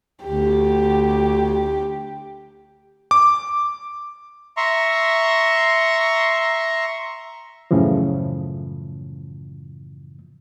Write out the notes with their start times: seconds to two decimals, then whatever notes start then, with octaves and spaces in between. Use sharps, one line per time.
0.24 D2 G4
3.11 D6
4.57 E5 A#5 C6 C#6
7.71 F#2 A2 C#3 E3 F3